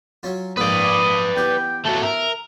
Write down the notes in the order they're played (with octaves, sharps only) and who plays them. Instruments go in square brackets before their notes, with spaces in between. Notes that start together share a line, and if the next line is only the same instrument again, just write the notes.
[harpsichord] F#3 C#4 F4
[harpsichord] A#1 G#2 A#3 [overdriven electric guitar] B4 D5 [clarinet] D#6
[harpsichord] E2 G4 [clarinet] G5
[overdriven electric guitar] F#3 A3 [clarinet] A5
[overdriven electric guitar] A#4 [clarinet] E5